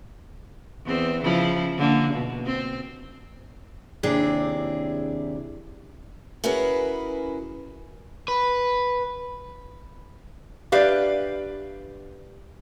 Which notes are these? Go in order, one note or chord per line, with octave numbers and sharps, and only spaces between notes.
E2 C4
C#3 F3 E4
D3 A#3
B2
C4
D#2 C3 D4 E4 G#4
C#4 E4 F#4 G#4 A#4 B4
B4
D4 G4 B4 D5 E5 F5